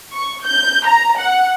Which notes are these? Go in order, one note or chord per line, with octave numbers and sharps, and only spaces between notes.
C#6
G6
A#5
F#5